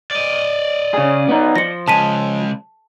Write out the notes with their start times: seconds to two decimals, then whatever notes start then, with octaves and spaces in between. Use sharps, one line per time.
0.11 D5 D#5
0.94 C#3 G#4
1.29 B3 D#4
1.56 F3 A#6 C#7
1.88 C#3 G#3 A5 B6 D#7